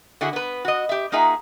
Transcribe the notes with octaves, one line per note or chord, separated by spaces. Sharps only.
D3 E4 F#4 G#4
B3 B4
F#4 D#5
G4 E5
A#3 D#4 F4 G#4 E5 F#5